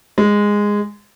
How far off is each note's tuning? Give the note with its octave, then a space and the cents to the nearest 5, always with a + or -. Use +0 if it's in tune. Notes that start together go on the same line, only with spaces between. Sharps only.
G#3 -10